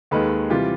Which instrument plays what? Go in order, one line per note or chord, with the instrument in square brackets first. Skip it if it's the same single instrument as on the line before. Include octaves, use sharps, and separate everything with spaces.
[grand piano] D#2 D#3 G#3 A4 B4
C3 E3 G3 F4 G4